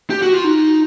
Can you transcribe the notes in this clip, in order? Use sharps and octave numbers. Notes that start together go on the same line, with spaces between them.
G4
F#4
F4
D#4